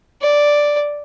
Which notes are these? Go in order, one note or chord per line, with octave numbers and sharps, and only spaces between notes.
D5